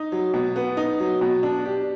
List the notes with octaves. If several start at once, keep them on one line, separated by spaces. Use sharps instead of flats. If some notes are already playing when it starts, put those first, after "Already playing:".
Already playing: D#4
F#3
B2
B3
D#4
F#3
B2
D4
G4